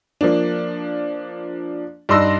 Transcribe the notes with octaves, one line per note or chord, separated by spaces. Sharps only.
F3 A#3 D4
G2 D4 D#4 C6 E6 A#6